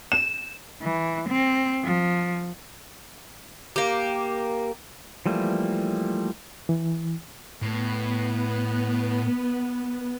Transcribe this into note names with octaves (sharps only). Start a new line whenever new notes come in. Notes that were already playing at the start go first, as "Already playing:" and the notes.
E7
E3
C4
F3
A#3 G4
E3 F3 G3 A3 A#3
E3
A2 B3